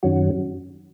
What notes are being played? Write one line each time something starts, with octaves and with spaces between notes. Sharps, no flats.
F#2 D#3 F#3 C#4 F#4